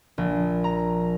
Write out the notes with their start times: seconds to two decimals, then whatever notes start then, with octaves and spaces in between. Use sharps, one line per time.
0.18 A#1
0.64 A#5